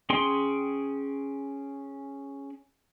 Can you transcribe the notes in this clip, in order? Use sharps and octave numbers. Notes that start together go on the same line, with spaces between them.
C#4 G#4 G5 C6